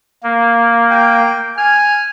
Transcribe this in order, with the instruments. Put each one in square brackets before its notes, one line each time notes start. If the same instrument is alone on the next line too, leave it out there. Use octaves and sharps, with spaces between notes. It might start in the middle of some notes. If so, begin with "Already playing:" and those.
[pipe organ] A#3
[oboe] G5
[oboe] G#5 [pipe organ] F6